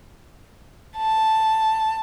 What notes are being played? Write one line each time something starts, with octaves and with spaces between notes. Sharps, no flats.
A5